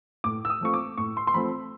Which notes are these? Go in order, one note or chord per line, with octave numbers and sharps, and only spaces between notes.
A2 D6
E6
D#6
F3 A3 C4 F4 C#6
D6
A2 C#6
C6
C6
F3 A3 C4 F4 B5